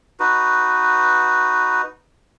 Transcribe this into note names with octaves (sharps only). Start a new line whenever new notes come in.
D#4 F#4 B4